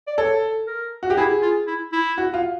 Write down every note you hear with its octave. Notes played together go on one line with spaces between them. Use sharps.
D5
A4 C#5
A#4
F#4
G4
E4 G#4
F4
E4
E4
F#4
F4